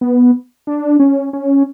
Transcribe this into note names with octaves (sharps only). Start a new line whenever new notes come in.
B3
D4
C#4
C#4